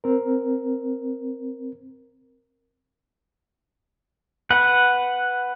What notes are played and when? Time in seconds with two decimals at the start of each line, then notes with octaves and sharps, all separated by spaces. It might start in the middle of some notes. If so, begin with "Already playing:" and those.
0.04 C4 A#4
4.50 B4 F#5